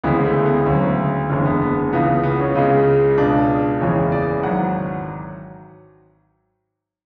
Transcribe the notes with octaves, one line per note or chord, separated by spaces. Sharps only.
D2 C#3 E3 G#3 B3
A3
B3
D2 C#3 F#3 C#4
F#1 E2 D3 G#3 C#4
B3
B3
C#2 C#3 E3 B3
B3
B3
C#4
C#2 C#3 G#3
C#2 B2 G#3 D4
F#1 E2 C#3 E3 G#3 C#5
D5
G#1 F#3 F#5